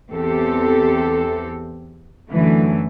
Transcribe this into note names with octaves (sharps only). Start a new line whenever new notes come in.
E2 C4 G4 A4
F#2 D3 E3 A3